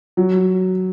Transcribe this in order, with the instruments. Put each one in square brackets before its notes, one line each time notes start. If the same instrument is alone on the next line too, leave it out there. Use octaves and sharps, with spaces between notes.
[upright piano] F#3